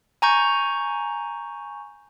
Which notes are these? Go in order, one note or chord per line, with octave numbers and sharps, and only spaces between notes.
G#5 A#5 C#6 G6